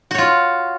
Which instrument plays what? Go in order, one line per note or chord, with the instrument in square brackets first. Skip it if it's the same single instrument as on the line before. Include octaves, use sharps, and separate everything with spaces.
[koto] F#4
C#5
F4